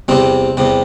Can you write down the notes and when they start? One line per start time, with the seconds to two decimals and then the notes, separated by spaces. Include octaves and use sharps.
0.08 E2 C3 G3 C4
0.57 E2 C3 G3